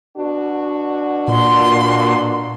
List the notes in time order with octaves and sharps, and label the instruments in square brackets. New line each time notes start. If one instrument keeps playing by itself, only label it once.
[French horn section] B2 D4 F#4
[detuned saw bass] A#2 [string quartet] C6